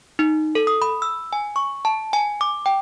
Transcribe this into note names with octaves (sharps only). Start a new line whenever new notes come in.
D#4
A4
D#6
B5
E6
G#5
C#6
A5
G#5
D6
G5